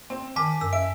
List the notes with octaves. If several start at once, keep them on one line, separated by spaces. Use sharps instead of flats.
C4
D#3 G#5 A5 D6 B6
F#2 E6
E5 D7